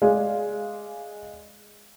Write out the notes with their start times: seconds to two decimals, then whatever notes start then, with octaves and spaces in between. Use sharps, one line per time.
0.02 G#3 G#4 D5 F5